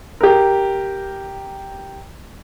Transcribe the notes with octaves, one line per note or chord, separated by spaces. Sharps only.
G4 A#4